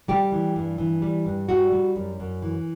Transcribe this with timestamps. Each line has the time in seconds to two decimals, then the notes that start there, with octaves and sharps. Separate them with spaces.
0.08 G3 G4
0.32 E3
0.56 G2
0.78 E3
1.02 G3
1.26 G2
1.49 G3 F#4
1.72 G3
1.96 F#2
2.20 F#2
2.42 E3